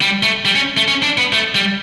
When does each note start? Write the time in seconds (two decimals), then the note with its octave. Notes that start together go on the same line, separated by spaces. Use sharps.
0.01 G3
0.23 A3
0.45 G3
0.55 C#4
0.77 A3
0.88 C#4
1.03 D4
1.18 B3
1.33 A3
1.55 G3